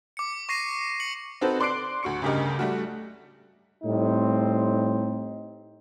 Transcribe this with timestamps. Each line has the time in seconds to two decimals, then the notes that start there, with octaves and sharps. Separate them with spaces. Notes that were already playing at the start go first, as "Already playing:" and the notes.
0.17 D6 C#7
0.49 C#6 A#6 C7 D#7
1.00 C#7 F#7
1.41 C4 D#4 F#4 A4 B4 C5
1.60 D5 C6 D6 F#6 C7 D7
2.03 D2 F#4 C#6 C#7
2.22 D2 G2 C#3 G4 A#4 D#5
2.59 G3 A3 F#4
3.84 A2 G3 C4 D#4